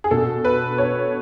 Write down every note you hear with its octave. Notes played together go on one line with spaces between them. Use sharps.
G#4
B2 A4
B4
C#5